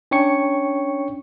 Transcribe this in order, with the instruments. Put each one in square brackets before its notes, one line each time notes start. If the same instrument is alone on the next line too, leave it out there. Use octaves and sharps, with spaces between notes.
[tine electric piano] C#4 D4 C#5 G5 C#6 C#7